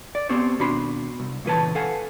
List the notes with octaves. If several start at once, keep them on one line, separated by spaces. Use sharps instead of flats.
D5
B3 C4 G4 C5 C#5
D#2 B2 D4 F#4 B5 C6
C2
C#2 A#2 E3 B4 C#5 A5
A4 F5 F#5 G#5